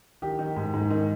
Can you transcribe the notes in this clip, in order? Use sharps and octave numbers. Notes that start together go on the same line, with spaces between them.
D#3 G4
D#3
G#2
G#2
D#3